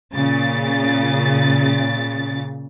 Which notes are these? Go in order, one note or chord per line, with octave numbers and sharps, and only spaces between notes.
A#2 C#3 A6